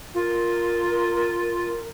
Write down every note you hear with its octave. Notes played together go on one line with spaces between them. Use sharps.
F4 A#4